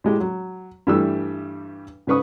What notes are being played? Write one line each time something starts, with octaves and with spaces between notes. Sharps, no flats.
A2 G#3 G4
F#3
G2 E3 G3 A3 E6
G#2 C#3 B4 C#6 D#6